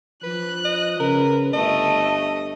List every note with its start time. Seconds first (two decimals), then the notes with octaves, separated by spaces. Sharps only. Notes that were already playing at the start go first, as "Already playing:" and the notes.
0.23 F3 B4 F#6
0.65 D#5
1.00 C#3 A#4 B4
1.54 G1 A3 D#5